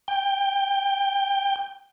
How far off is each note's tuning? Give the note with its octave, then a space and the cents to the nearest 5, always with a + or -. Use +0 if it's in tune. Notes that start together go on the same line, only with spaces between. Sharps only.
G5 +10